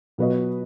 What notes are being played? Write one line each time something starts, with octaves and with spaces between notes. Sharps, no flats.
B2 F#3 B3 F#4 B4 D#5